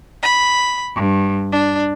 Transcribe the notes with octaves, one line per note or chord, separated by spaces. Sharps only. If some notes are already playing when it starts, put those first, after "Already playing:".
B5
G2
D4